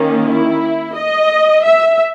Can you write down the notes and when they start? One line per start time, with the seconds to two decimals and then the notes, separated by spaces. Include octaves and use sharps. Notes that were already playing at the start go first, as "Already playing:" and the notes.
Already playing: D#3 A#3 C#4
0.28 E4
0.96 D#5
1.64 E5